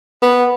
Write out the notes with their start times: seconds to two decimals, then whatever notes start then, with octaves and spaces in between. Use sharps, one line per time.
0.22 B3